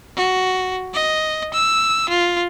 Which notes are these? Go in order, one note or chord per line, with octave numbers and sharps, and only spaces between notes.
F#4
D#5
E6
F4